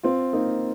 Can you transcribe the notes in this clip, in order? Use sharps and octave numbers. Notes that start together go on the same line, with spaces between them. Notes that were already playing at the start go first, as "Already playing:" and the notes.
C4 F4
A#3 D#4